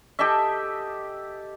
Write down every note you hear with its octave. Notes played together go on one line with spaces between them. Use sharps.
G4 A4 D#5 E5